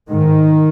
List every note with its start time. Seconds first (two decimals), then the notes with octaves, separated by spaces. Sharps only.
0.09 G#2 D#3